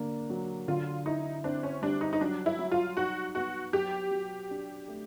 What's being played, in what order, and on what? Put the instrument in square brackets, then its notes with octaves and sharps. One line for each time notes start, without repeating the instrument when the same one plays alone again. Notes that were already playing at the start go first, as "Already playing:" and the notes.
Already playing: [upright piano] D3 A#3 D4
F#3
[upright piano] D3 [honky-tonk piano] F4
[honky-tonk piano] D#4 [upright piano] E4
[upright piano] C4 [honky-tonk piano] D4
[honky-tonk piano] C#4
[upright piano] G3 [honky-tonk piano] D4
[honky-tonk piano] D#4
D#4
[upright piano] F#3 [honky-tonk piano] D4
[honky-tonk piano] E4
[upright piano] F#3
[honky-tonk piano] F4
[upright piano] D#4 [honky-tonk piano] F#4
[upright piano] B3 [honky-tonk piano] F#4
[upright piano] F#3 [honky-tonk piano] G4
[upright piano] F#3
D4
A3